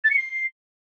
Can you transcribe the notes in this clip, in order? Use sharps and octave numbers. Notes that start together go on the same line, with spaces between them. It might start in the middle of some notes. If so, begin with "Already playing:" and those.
A6
C#7
C7